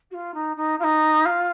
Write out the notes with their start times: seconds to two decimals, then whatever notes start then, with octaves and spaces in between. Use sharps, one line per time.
0.10 F#4
0.14 F4
0.34 D#4
0.56 D#4
0.79 F4
0.83 D#4
1.25 F4